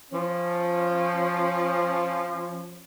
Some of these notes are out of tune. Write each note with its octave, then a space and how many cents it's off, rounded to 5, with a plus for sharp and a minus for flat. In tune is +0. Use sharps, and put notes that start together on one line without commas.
F3 -5 C#4 -25